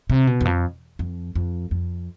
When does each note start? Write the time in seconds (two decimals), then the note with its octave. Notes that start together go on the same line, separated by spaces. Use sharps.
0.10 C3
0.27 B2
0.41 E2
0.45 F2
0.99 F2
1.35 F2
1.71 F2